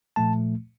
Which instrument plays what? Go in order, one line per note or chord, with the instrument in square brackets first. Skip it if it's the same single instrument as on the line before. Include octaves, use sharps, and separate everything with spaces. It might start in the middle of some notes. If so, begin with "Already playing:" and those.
[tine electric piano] A#2 F3 A3 A5